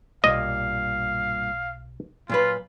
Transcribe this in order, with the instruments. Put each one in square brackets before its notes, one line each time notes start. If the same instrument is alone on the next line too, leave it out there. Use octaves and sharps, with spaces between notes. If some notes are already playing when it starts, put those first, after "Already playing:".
[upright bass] B1 [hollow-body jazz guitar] G2 A#2 [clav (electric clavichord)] D#5 [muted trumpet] F5
[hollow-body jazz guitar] A#2 F#3 B4 [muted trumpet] F4